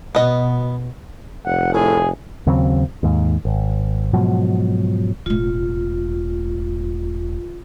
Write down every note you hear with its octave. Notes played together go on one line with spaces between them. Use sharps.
B2 B3 D#5
F1 F#5
A2 G#4
D#2 C#3 F#3 C4
D#2 G#2
G#1
G#2 B2 F3 F#3
E1 A2 F4